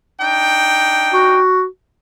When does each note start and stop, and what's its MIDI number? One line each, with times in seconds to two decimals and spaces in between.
0.21 1.42 62
0.21 1.42 63
0.21 1.42 79
1.13 1.65 66